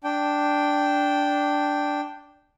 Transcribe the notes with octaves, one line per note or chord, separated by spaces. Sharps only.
D4 G5